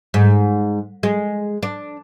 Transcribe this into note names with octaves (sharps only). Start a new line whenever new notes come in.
G#2
G#3
D4